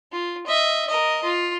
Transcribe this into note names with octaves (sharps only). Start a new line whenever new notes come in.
F4
D#5 E5
A#4 D#5
F4